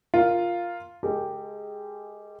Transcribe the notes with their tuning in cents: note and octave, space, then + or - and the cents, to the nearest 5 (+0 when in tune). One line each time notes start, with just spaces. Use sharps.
F4 +0 A#4 +0
G#3 +5 G4 +0 A#4 -40